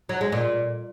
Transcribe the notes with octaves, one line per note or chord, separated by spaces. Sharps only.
F#3
G#3
A#2